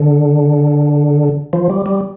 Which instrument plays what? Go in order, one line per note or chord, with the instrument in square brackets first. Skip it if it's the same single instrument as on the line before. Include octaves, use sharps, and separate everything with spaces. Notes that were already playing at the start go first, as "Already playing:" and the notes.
Already playing: [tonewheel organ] D3
F3
G3
G3